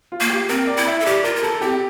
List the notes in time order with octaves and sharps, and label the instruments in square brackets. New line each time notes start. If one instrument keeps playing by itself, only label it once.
[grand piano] F4
[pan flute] A#3
[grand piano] G4
[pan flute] C4 [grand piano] A#4
[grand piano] D5
[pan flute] E4
[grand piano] E5
[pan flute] A4
[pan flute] G4 [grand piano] D5
[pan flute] F4 [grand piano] A#4
[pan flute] F4
[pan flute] E4 [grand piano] A4
[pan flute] C4 [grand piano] G4